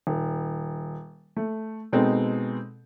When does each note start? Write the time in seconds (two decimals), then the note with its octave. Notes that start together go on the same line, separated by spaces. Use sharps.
0.07 D#1
1.37 A3
1.93 B2 G#3 C4 D#4 A4